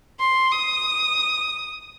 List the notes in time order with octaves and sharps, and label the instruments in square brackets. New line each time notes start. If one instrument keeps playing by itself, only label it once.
[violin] C6
D#6